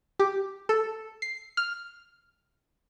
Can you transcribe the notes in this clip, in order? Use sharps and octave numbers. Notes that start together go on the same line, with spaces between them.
G4
A4
C7
F6